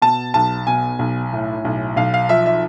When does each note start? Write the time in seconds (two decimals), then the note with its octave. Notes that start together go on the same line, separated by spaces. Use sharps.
0.02 B2 A5
0.34 B1 A5
0.67 B2 G#5
0.99 B1
1.32 A2
1.65 B1
1.96 B1 F5
2.14 F5
2.29 F3 E5
2.46 E5